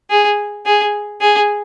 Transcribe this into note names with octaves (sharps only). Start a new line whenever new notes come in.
G#4
G#4
G#4